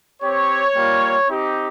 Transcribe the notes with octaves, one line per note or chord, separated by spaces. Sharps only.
C4 G4 C#5
G3 A#3 F4
C4 D#4 G4